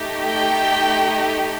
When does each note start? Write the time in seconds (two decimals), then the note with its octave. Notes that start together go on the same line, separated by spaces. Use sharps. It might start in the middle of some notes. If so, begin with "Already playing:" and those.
Already playing: A3 D#4 G4
0.27 G5